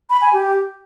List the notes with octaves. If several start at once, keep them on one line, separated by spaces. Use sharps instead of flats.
B5
G#5
G4